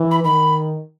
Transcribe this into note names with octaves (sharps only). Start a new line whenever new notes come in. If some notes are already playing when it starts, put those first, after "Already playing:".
Already playing: E3
B5
D#3 B5